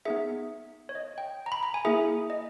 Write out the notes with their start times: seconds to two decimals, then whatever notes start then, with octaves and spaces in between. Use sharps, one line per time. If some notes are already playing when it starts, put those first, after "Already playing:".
0.05 B3 D#4 G#4 E5
0.89 C#5
0.95 D#5
1.18 G5
1.46 A#5
1.52 B5
1.63 A#5
1.74 G#5
1.85 A#3 E4 G#4 E5
2.30 D#5